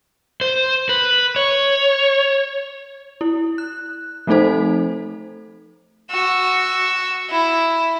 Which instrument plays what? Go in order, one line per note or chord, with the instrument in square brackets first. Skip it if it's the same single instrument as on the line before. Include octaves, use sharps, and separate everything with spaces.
[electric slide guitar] C5
B4
C#5
[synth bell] E4
F#6
F3 A3 C4 D#4 A4 C5
[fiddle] F#4 E6
E4